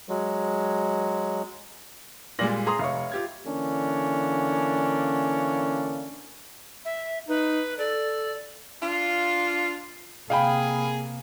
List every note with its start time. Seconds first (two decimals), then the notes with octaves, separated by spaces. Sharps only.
0.09 F#3 G#3
2.39 A#2 G3 G#3 D5 A#6 F#7
2.67 G#4 A#5 C6 D#6
2.79 F1 C#5 E5 F5 C#6
3.12 F4 G4 G#6
3.46 D3 E3 A#3 C#4 D4
6.85 E5
7.29 D#4 B4
7.78 A4 D5
8.81 D4 F4
10.30 C3 A#3 G#4 F5 G5 B5